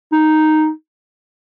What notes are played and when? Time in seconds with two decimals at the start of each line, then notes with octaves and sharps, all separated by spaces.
0.13 D#4